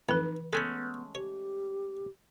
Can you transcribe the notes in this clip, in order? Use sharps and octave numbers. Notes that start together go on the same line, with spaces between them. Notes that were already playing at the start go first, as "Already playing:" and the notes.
F2 A2 E3 D#4 B4
G#3 A3 B3 C#4 A4 G#5 B5
G4 C#5